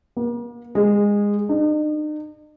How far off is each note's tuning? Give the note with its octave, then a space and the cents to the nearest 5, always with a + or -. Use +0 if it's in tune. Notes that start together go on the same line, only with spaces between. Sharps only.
A#3 +40
G#3 -20
D#4 -40